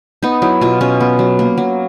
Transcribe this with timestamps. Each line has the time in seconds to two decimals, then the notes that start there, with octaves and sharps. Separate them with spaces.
0.23 B3 D#4
0.42 F#3 E4
0.61 B2 F4
0.81 B2 C#4
1.01 B3
1.19 F#3
1.39 A#3
1.58 F#3